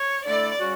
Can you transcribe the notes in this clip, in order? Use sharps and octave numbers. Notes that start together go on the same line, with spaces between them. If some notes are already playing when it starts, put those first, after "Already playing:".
Already playing: C#5
D3 A3 E4 A4 D5
C#3 G3 C#4 F#4